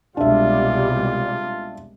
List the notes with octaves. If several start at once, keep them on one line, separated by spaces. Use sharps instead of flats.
C2 B2 G3 G#3 D4 F4 E5